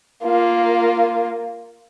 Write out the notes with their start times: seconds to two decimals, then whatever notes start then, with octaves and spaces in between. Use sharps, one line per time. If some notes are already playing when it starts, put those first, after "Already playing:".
0.25 A#3 F4